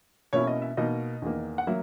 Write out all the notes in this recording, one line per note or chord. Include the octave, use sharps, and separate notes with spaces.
B2 A#3 C#4 E4 C#5
D#5
E5
B2 A#3 D#4 D#5
E2 D#3 A#3
F#5
F#3 A#3 E5